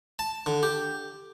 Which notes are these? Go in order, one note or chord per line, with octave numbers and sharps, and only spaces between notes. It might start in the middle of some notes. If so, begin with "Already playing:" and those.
A5
D3
G4